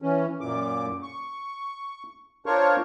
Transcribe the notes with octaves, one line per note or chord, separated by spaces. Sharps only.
E3 C#4
F#2 A#2 D6
C#6
D4 F4 A#4 C5 C#5 C#6